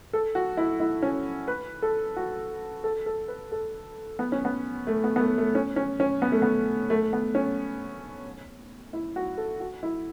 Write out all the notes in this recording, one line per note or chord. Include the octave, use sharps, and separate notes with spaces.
A4
F#4
E4
E4
C#4
B4
A4
F#4
A4
A4
B4
A4
B3
C#4
B3
A3
B3
B3
A3
A3
C#4
C#4
C#4
B3
A3
B3
A3
B3
C#4
E4
F#4
A4
F#4
E4